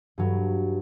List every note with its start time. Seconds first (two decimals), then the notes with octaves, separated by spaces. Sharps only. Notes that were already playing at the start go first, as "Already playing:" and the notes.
0.18 G2 F#3